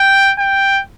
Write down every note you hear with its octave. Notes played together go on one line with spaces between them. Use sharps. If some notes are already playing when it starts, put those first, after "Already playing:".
Already playing: G5
G5